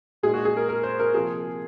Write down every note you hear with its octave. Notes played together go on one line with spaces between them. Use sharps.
A#2 G#3 D#4 G#4
F#4
G#4
A#4
A#4
C5
A#4
C3 F3 A#3 F4 G#4